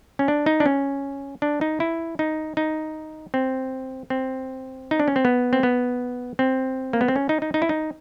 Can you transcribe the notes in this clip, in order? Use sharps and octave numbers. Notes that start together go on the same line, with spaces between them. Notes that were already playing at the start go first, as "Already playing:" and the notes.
C#4
D4
D#4
D4
C#4
D4
D#4
E4
D#4
D#4
C4
C4
D#4
D4
C#4
C4
B3
C4
B3
C4
A#3
B3
C4
C#4
D#4
D#4
D#4
E4
D#4